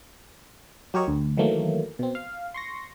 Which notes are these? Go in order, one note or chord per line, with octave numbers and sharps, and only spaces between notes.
F#3 G4 A#4 C#5 D#5
D2
D#3 E3 F#3 A3 A#3
B2 C4
F5
C6 C#6 A#6